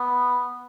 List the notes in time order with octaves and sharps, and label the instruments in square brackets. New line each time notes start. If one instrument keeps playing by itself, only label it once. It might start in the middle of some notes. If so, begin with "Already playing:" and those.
Already playing: [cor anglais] B3